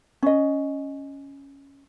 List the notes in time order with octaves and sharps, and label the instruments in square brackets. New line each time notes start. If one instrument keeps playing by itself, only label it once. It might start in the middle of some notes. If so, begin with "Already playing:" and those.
[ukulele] C#4 D#5